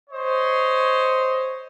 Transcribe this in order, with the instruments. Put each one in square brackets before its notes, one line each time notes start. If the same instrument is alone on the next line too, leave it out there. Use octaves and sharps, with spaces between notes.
[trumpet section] C5 C#5 D#5